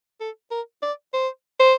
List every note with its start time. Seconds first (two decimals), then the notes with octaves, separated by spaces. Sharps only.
0.21 A4
0.51 A#4
0.83 D5
1.14 C5
1.60 C5